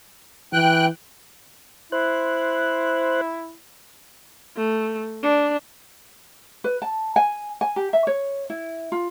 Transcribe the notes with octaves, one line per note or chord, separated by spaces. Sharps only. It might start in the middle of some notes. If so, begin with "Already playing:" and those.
E3 G5 F#6
E4 C5 F#6
A3
D4
B4
A5
G#5
G#5
G4
E5
C#5
E4
F4